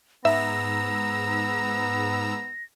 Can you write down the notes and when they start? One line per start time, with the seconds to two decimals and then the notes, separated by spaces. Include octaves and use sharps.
0.25 G#2 B3 E5 A#5 E6 A#6